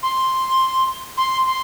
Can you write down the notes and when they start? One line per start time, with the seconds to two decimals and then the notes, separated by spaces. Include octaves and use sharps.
0.03 C6
1.17 C6
1.46 C6